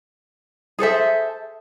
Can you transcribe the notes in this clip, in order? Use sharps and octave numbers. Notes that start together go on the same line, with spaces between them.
G#4 A4 C5 E5